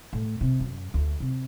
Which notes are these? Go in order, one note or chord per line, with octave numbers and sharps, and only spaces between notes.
A2
C3
F#2
D2
C3